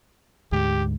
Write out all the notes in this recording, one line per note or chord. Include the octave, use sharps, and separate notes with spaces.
D2 G#2 G4